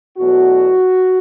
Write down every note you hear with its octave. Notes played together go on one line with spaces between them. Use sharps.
E2 B2 F#3 A3 F#4